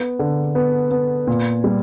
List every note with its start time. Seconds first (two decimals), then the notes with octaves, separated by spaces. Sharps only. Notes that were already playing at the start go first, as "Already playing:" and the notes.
Already playing: B3
0.19 D3
0.55 B3
0.91 B3
1.27 A#2
1.64 G3